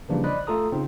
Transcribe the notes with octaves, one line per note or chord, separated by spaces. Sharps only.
C#3 E3 F3 G3 A#3 D4
C5 D5 D#5 B5 F#6
A3 F4 A4 A#5 D#6
C#3 C4 D#4 F4